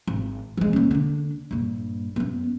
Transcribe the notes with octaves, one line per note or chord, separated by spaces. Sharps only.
G#1
F3 G#3
D#2 C#4
D3 D4
A#1 G2
F#2 B3